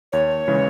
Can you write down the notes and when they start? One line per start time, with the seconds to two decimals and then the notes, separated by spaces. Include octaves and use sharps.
0.13 D#2 C#5
0.48 C#3 E3 G#3